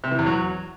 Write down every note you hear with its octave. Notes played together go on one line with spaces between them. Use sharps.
C3
E3
E2
F#3